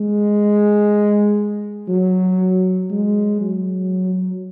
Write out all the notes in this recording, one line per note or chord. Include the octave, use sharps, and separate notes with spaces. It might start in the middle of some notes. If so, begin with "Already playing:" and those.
Already playing: G#3
F#3
G#3
F#3